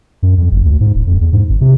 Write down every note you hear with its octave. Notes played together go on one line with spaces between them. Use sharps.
F#2
F2
G1
D2
G#2
D1
F2
E2
G#2
G#1
C3